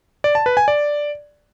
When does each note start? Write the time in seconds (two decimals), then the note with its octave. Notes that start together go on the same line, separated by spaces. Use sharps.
0.24 D5
0.35 A5
0.46 B4
0.57 G#5
0.68 D5